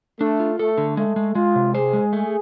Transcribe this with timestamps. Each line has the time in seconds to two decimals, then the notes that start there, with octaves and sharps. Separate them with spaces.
0.20 A3 D4
0.40 F4
0.59 A3 A4
0.78 D3
0.97 G#3 A3
1.16 G#3
1.35 G#3 F4
1.55 C3
1.75 G#4 C5
1.93 G#3
2.13 A3